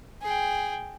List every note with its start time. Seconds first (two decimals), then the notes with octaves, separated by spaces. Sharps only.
0.22 G#4 G5